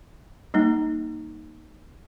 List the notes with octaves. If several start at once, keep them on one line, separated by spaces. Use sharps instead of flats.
G3 A#3 D#4